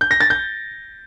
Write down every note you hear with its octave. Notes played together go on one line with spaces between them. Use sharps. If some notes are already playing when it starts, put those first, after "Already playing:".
G6
A#6
A6
G6